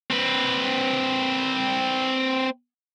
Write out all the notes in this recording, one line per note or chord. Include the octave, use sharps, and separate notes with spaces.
C4 B4